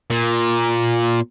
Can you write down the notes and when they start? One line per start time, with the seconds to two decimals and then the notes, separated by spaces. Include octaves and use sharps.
0.10 A#2